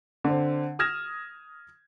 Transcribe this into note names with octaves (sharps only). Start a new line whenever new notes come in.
D3 C4
D#6 F6 G#6 A#6 E7